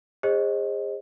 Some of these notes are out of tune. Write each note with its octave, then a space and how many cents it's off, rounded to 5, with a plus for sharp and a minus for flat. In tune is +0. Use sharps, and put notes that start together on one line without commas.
G#4 -30 C5 +40 D#5 +0